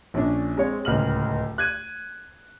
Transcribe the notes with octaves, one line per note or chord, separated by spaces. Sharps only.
A#1 C#4 D4
G#3 C4 C#5
D1 C#2 F6 F#7
F#6 G#6 D#7